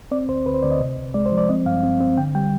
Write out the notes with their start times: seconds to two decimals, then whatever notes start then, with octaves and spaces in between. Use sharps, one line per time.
0.11 C4 D5
0.29 D2 C5
0.46 D2 B4
0.54 C5
0.63 D2 D5
0.71 D#5
0.80 C3
0.97 C2
1.14 G#3 D5
1.26 C5
1.32 F3
1.38 D5
1.49 C4 D#5
1.66 G2 F5
1.84 C4
2.00 C4
2.18 D3 G5
2.35 G3 G5